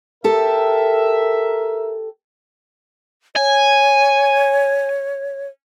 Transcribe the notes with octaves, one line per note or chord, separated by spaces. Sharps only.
G4 A4 A#4 E5
C#5 G#5